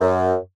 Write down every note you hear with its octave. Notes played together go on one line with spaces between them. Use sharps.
F#2